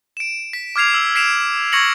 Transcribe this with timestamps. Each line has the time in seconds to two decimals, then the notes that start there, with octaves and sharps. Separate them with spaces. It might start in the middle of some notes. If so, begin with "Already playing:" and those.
0.17 D7 E7
0.53 B6
0.76 D6 F6 G#6 C7 F7
0.94 E6
1.15 B6 C7 D7 E7 F7
1.72 C#6 G#6 A#6 C#7 F#7